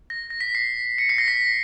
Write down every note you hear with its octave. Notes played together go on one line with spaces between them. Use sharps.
A#6
A#6
B6
C7
C#7
C7
A#6
B6